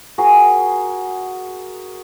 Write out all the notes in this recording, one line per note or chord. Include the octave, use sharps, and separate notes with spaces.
F#4 G#4 A#4